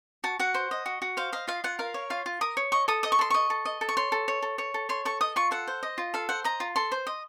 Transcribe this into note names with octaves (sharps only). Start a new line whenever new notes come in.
F#4 A5
F#4 F#5
C5
D#5
F#4
F#4
C5 F5
D#5 F5
F4 F5
F4 F#5
A#4 F5
C#5
F4 F5
F4
A#4 D#6
C#5
D#5 C#6
A4 D#6
D#5 D#6
C#6
A4 C6
D#5 C#6
A4
D#5
A4
C#6
C#5 C6
A4
C#5
A4
C#5
A4
C#5 C6
A4 C#6
D#5 D#6
F4 C#6
A4 F#5
C5
D#5
F4
A4 F5
C5 F#5
D#5 A#5
F4
A4 C6
C5
D#5